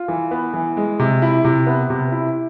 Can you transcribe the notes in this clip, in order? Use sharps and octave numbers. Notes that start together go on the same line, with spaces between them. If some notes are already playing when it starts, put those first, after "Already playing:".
Already playing: F4
E3
B3
E3
G#3
C3
E4
C3
B3
C3
E4